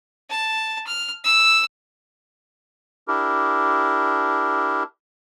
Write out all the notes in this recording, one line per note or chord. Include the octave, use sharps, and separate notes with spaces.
A5
F6
E6
D4 E4 G4 A#4